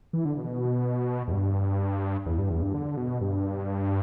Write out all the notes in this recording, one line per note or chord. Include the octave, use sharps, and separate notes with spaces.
E3
D3
B2
E2
G2
E2
G2
E2
G2
D3
B2
G2